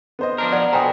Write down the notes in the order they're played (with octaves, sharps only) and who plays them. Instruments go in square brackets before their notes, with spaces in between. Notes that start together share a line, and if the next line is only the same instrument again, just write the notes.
[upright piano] B3 C5 D#5
[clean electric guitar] F3 D4 A#4
[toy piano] D5 [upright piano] F#5
[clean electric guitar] B2 [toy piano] A4 G5 A#5 [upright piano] C5 G#5